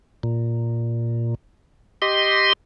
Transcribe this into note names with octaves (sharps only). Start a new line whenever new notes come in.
A#2
G4 D#5 C6